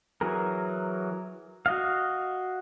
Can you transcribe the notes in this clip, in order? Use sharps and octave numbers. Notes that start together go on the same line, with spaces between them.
E3 F#3 G#4 A#4
F#4 D#5 F5